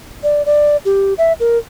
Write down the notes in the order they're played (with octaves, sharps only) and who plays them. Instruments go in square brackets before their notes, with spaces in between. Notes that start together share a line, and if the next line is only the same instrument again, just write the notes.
[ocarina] D5
D5
G4
E5
A#4